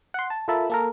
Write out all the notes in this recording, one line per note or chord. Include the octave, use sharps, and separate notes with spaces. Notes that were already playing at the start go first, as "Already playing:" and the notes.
F#5 C6
A5
F4 A4 A#4 E5 A5 B5
A#3 A4 A#4